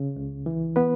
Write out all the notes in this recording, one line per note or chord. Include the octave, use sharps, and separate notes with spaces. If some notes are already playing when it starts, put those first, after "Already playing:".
Already playing: C#3
C#2
E3
B3 B4